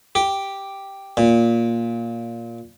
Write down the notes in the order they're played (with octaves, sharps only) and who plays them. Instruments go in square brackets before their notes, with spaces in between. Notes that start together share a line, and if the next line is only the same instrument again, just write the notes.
[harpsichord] G4
A#2